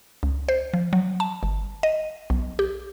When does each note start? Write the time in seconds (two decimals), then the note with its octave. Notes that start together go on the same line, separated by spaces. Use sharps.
0.23 C#2
0.49 C5
0.74 F3
0.93 F#3
1.20 A5
1.43 G1
1.83 D#5
2.30 B1
2.59 G4